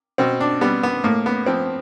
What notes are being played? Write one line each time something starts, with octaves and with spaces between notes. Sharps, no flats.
B2 C4
D4
G3 B3
B3
A2 A#3
B3
F3 C4